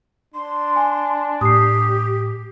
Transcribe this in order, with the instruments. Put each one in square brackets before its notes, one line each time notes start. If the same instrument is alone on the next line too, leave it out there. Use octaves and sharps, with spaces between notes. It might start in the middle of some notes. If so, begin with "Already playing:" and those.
[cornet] D4 [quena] C6
[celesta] G#5
[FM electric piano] A2 [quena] G4 [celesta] D#6 C7